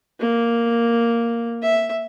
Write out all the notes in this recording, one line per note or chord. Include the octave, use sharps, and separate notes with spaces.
A#3
E5